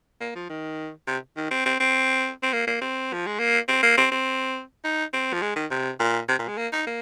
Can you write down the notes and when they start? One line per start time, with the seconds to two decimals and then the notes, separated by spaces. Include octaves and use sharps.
0.21 A#3
0.35 F3
0.49 D#3
1.07 C3
1.36 D#3
1.51 C4
1.66 C4
1.80 C4
2.42 C4
2.53 A#3
2.67 A#3
2.81 C4
3.13 F3
3.26 G#3
3.39 A#3
3.68 C4
3.83 A#3
3.97 C4
4.11 C4
4.84 D#4
5.13 C4
5.33 F3
5.42 G#3
5.56 D#3
5.71 C3
5.99 A#2
6.28 C3
6.39 A#2
6.48 G#3
6.57 A#3
6.72 D#4
6.87 A#3